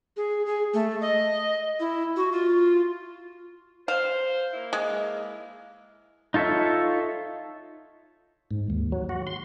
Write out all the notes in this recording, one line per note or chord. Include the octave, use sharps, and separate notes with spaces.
G#4
G#4
A3
D#5
E4
F#4
F4
C5 F5
A#3 E4
G#3
D#4 F4 A4 C#5 E5
G#2
D#2
F#3
F#4
C6